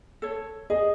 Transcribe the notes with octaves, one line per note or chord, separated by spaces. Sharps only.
A4 C#5
G#4 D#5